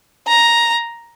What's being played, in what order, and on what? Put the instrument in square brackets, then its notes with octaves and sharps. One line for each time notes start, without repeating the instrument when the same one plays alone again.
[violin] A#5